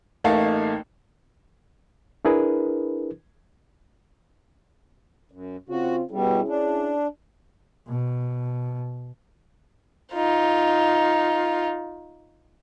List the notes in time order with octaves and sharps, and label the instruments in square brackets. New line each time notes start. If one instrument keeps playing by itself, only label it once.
[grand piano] A1 A3 A#3 D#4 F5 A5
[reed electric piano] D4 E4 G#4 A#4 B4
[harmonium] F#2
[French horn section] C#3 C4 F4 [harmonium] F#4
[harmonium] B2 G3 [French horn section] C#4 E4 G#4
[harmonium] D4
[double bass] B2
[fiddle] D#4 F4